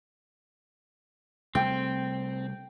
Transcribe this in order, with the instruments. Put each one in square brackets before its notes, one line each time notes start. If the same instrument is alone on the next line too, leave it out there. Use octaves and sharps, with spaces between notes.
[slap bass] C3 G3 A3 [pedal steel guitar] C4 [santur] G5